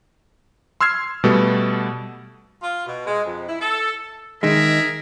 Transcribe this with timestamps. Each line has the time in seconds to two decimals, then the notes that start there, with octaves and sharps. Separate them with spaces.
0.81 C6 E6 F6 G#6 C7
1.24 B2 G3 A3 B3 A4
2.62 F4
2.87 B2
3.07 G#3
3.25 F2
3.48 E4
3.61 A4
4.43 D#3 G#3 G#4 A#4 E5